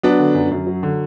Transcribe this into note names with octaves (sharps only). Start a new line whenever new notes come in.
F#3 B3 D4
D3
F#2
F#2
F#3
D3